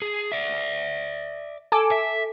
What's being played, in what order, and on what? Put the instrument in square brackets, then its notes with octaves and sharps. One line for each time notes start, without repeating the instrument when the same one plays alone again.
[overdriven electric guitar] G#4
D5 E5
[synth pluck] A4 G#5 D6
[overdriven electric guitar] E5